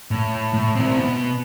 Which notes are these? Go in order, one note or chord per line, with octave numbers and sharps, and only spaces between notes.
A2
A2
C4 E4
B2 B3